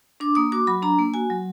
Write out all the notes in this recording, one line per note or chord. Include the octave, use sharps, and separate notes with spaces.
D4 D6
A#3 D#6
F#4 D6
F#3 B5
D4 A#5
A#3
F#4 G#5
F#3